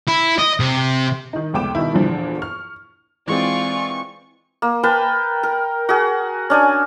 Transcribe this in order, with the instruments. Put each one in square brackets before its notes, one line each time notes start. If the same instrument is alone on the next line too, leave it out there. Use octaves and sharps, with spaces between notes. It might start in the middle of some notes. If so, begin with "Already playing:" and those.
[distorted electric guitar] E4
D#5
C3
[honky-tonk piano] D#3 D#4
F1 C#2 B3 G5 D6 E7
B2 D#3 E4
E2 A#2 D3 E3 F3
C#6 F6
[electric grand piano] E3 G#3 C4 [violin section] F4 D5 G#5 [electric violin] C#6
[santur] A#3
A#4 B4 G5 A5
A#4
F#4 G#4
C#4 D4 G#5